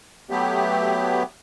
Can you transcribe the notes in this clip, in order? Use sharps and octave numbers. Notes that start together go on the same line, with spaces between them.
F#3 A3 B3 G4